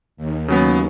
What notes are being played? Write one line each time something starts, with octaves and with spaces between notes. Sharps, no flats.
D#2
C#3 F#3 B3